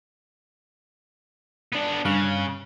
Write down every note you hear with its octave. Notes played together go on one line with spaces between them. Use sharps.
B3 D4
G2 C#3 F5 F#6